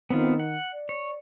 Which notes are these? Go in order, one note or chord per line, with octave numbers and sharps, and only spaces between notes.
D#3 B3 C4 F4
F#5
D5
C#5